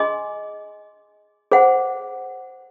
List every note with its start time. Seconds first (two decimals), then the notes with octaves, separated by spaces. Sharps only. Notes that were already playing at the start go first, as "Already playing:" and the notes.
Already playing: G#4 D#5 G#5 C6
1.51 G#4 C5 F#5